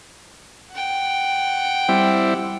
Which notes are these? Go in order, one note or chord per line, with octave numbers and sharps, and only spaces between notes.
F#5 G5
G3 C4 E4